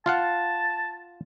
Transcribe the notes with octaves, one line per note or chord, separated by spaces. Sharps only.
F4 F5 F#5 A5